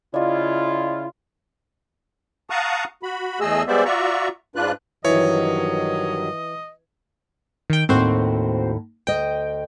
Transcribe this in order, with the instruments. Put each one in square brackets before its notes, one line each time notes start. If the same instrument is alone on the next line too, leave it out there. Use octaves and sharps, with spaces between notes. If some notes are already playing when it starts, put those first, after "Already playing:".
[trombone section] C#3 E4 F4 [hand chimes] D5 D#5
[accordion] F5 F#5 A5 A#5 C#6 D#6
F#4 B5
E2 A3 G#4 D#5 E6
G3 G#3 B3 C5 D5 E5
F4 F#4 D5 E5 A#5 C#6
G#2 D4 F4 B4 F#6
[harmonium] G2 D#3 F#3 [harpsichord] E3 [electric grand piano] C#5 [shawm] D#5
[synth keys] D#3 G5
[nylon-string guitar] D#2 A2 [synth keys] C4 F#4 C5
[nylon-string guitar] D2 D#5 [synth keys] G5